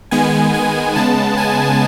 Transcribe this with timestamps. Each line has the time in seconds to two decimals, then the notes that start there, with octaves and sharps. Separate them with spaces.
0.11 D#3 G#3 B3 G#5
0.54 G#5
0.96 C#3 G#3 B3 A5
1.37 G#5